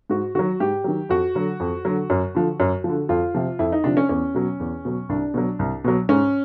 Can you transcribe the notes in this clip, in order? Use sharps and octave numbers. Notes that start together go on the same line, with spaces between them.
G#2 F#4
D#3 F#3 F#4
G#2 G4
D#3 F#3
F2 F#4
D3 F#3
F2
D3 F#3
F#2
D3 F3
F#2
D3 F3
F2 F4
C3 F3
F2 E4
D#4
C3 F3 D4
C#4
E2 C#4
B2 F#3
E2
B2 F#3
C2 D4
B2 F#3
C2
B2 F#3
G#2 C#4